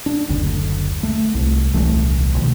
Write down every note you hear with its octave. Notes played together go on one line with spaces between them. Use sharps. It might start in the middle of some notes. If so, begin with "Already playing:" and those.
D4
F#1 D2 D3
A3
C2
D#1 C2 E3 A3
A#1 B2 D#3